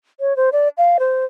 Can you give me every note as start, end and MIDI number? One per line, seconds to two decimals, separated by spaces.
0.20 0.36 73
0.36 0.50 72
0.52 0.68 74
0.78 0.97 77
0.99 1.25 72